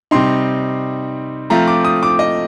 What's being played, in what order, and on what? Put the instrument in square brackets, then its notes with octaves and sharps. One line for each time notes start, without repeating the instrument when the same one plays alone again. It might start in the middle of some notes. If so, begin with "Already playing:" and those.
[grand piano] C3 G3 C4 D#4 C6
F3 A3 C4 F4 A#5
D6
D#6
D6
D#5